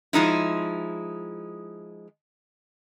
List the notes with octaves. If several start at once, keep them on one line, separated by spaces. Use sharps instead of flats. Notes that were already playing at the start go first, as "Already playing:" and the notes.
F3 G#3 D#4 E4